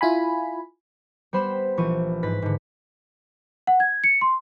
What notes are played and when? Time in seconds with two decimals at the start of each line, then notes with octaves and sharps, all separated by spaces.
0.01 E4 F4 G#5 B5
1.33 G3 B3 C5 B5 C6 E7
1.77 A#1 E3 C#6 D#7
2.23 G#2 B4 A6 B6
2.42 G#2 D3
3.67 F#5
3.80 G#6
4.04 C#7
4.21 C6